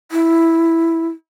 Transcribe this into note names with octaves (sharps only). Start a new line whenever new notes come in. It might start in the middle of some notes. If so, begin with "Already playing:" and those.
E4